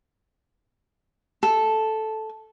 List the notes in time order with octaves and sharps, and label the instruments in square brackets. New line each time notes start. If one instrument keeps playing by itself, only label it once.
[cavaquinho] A4